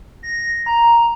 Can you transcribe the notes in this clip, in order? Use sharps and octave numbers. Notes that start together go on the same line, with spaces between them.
A#6
A#5